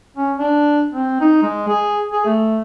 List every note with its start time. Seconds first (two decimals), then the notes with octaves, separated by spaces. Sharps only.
0.17 C#4
0.38 D4
0.93 C4
1.21 D#4
1.42 G#3
1.68 G#4
2.12 G#4
2.25 A3